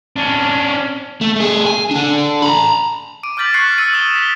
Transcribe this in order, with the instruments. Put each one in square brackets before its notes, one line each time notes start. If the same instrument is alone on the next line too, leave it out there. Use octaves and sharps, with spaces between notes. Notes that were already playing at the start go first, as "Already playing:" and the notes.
[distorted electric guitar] C#4 D4
[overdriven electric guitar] A3
A3 G#4
G#5
D4 A4
A#5 B5
[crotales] D6 D7 D#7
D6 F6 G6 A6 B6 F#7
C#6 D6 F6 F#6 C7 C#7
E6 F#6 A6 C7 C#7 D#7
D#6 D#7 E7 G7
B6 G7